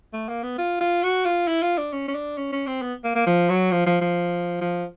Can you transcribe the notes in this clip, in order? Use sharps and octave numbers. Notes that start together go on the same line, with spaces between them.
A3
A#3
B3
F4
F4
F#4
F4
E4
F4
D4
C#4
C#4
D4
C#4
C#4
C4
B3
A#3
A#3
F3
F#3
F3
F3
F3
F3